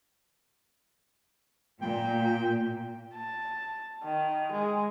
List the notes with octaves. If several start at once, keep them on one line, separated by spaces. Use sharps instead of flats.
A#2 G5
A5
D#3
G#3